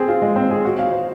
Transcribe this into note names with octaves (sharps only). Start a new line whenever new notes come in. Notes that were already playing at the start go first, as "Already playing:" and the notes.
Already playing: C4 G#4
F4
G#3
C4
G#4
F#4
F5
C5